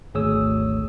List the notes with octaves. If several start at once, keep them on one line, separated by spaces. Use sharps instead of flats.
G#1 D2 G#4 C#5 D#6 E6